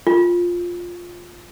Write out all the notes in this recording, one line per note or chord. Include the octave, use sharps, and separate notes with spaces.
F4